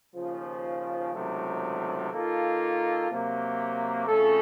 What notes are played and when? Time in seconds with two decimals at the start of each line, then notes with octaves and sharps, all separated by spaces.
0.15 D#2 C#3 F3
1.14 C#2 C3 D#3 F#3 A3
2.11 D#3 A#3 F4 A4
3.09 C3 F#3 A#3
4.06 F2 C#3 A3 C#4 A4